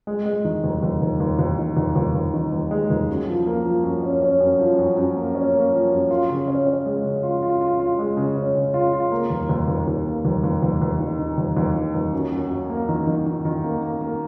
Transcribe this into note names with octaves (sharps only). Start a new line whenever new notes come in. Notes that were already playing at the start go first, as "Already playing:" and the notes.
G#3
G#3
D#3
D#2
D#2
D#2
D#2
D#2
D#3
D#2
D#2
D#2
D#3
D#2
G#3
D#2
F#2
F3
A#3
F3
F#2
C#4
C#4
F#2
F3
F#2
F#2
A#3
C#4
A#3
F3
F#2
F4
C#3
C#4
C#4
G#3
C#3
F4
F4
F4
F4
G#3
C#3
C#4
C#3
F4
F4
A#3
D#2
D#2
D#2
D#2
A#3
D#2
D#2
D#2
D#2
D#3
D#3
D#2
D#2
D#3
D#2
F#2
F#2
F#2
A#3
D#3
D#3
D#3
D#3
A#3
A#3
A#3